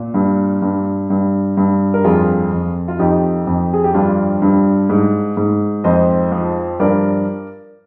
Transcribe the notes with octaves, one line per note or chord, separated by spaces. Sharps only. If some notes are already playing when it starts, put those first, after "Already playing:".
Already playing: A#2
G2
G2
G2
G2
A#4
F2 F4 G#4
F2
F4
F2 D#4 G4
F2
G#4
G4
G2 D4 F4
G2
G#2
G#2
F2 C5 D#5
F3
G2 A#4 D5